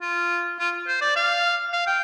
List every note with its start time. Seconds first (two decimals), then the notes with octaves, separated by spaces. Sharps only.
0.02 F4
0.59 F4
0.88 C5
1.01 D5
1.16 F5
1.73 F5
1.87 G5